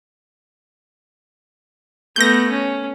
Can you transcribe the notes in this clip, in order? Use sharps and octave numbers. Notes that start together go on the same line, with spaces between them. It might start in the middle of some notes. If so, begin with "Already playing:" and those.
A3 B3 G6 A#6
C#4